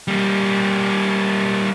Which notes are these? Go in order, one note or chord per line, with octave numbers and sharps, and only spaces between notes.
G3 A#3